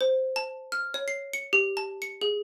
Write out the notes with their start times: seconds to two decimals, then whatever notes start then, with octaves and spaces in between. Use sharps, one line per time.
0.01 C5
0.36 A5
0.72 F6
0.94 C#5
1.08 C7
1.33 C#7
1.53 G4
1.77 A5
2.02 C#7
2.21 G#4